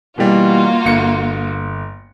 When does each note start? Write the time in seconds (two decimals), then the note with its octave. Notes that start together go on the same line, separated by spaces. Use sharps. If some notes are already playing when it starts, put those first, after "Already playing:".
0.18 B2 E3 G3 A#3 F4 F#4
0.85 G1 C#7